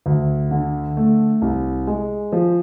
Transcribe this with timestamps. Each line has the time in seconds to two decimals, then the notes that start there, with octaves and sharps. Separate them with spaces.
0.06 D2
0.51 D3
0.97 A3
1.42 C2
1.87 G#3
2.32 F3